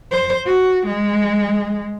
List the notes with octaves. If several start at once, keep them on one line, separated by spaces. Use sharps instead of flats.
C5
F#4
G#3